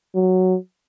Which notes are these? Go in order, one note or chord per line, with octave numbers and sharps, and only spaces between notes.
F#3